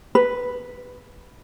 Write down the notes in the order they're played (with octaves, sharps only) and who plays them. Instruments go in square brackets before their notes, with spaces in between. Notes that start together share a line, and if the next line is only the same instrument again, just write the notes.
[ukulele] B4